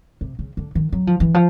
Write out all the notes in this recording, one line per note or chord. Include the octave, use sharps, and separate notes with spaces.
C3
C#3
D3
D#3
F#3
F3
E3
F3